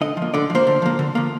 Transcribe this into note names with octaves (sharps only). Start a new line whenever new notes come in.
D3 D#5
F3 A#3
D3 D5
F3
A#3 C5
D3
F3 A#3
D3
F3 A#3